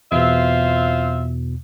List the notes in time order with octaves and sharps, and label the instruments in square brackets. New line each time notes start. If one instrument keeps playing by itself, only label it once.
[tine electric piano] E2 B2 [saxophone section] C4 F4 E5